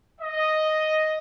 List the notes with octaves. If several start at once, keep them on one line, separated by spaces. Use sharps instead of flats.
D#5